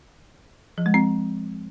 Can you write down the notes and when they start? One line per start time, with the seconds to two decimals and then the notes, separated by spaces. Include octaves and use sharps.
0.78 F3
0.86 G#3
0.94 C4